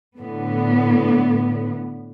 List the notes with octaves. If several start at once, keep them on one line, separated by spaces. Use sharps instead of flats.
A2 D3 B3